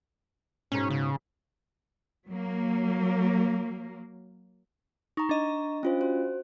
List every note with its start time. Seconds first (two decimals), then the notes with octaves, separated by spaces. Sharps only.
0.72 G#2 B2 C#4
0.90 C#3
2.27 F#3 A#3
5.17 D#4 A#5 C#6
5.29 D4 D#5
5.83 C#4 F4 C5
6.01 F#4 C5